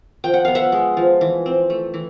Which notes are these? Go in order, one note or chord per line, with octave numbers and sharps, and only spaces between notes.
F3 G5
F#5
B3 F5
E5 F#5
G#3
F3
E3
C4
A3
E3